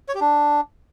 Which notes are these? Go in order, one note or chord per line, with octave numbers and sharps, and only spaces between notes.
C#5
G4
D4